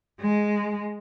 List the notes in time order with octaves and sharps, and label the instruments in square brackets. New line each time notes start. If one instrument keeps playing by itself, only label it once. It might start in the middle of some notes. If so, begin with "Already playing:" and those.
[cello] G#3